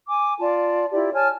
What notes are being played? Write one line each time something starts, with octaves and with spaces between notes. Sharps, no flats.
G#5 D6
F4 D5 A5
E4 F4 G4 D5
C#5 G#5 A5 F6